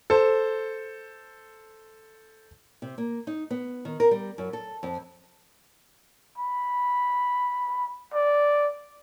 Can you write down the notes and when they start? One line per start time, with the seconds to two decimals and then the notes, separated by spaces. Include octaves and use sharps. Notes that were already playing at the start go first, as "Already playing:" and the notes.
0.10 A4 C5
2.82 C3
2.98 A#3
3.27 D#4
3.51 B3
3.85 D#3
4.00 A#4
4.11 G3
4.38 F#2
4.53 A4
4.83 F2
6.38 B5
8.14 D5